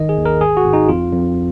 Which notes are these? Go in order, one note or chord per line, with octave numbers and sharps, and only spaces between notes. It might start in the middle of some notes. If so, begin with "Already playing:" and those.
Already playing: G#1 D#3 D#5
G#4
D#2
A#4
G#1 G#4
F#4
G#1
D#4
F2 F4
F2